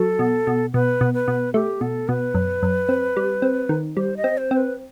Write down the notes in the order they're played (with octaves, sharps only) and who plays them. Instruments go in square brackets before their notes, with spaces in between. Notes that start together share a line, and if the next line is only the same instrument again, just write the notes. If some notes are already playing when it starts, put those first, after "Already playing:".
Already playing: [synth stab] F#3 [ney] A4
[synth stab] B2
B2
[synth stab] B2 [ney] B4
[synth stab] B2
[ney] B4
[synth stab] B2
[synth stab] A3 [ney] G4
[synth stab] B2 [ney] A4
[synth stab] B2 [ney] B4
[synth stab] F#2
F#2
C4
G3
C4
D#3
[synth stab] G3 [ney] C5
[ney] D#5
[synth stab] C4
[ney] C5
[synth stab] C4
[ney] B4